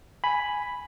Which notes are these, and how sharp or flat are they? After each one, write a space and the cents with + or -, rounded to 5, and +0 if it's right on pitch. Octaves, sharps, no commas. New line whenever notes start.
G#5 +0 B5 +0